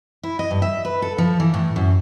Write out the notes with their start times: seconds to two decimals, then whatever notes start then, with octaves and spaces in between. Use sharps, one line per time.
0.23 E4
0.39 D#5
0.51 G2
0.62 E5
0.85 B4
1.02 A4
1.18 F3
1.40 E3
1.54 A2
1.76 F#2